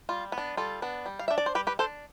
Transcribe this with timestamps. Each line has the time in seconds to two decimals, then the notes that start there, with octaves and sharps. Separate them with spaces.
0.09 G3 F4
0.32 B3
0.38 D4
0.57 G3 F4 A4
0.82 B3 D4
1.06 G3
1.19 F5
1.28 D4 E5
1.38 D5
1.46 C5
1.55 G3 G4 B4
1.67 G4 B4
1.79 D4 A4 C5